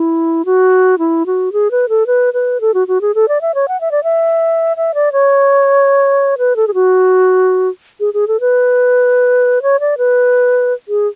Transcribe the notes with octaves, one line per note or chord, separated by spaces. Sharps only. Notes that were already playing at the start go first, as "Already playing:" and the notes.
Already playing: E4
F#4
E4
F#4
G#4
B4
A4
B4
B4
A4
F#4
F#4
G#4
A4
D5
E5
C#5
F#5
E5
D5
E5
E5
D5
C#5
B4
A4
G#4
F#4
G#4
G#4
A4
B4
C#5
D5
B4
G#4